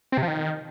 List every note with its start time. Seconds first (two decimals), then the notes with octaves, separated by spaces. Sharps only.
0.12 C4
0.17 C3
0.23 F3
0.28 D#3